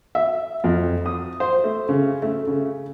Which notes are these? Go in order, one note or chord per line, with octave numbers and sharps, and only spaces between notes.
E5
F2
D#6
C5
A3
C#3
A3
C#3